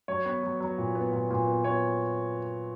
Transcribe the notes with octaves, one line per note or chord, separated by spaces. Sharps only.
F#3 C#5
B3 B4
F#3
F#3
A#2
B3
A#2
A#2
B3
B3 C#5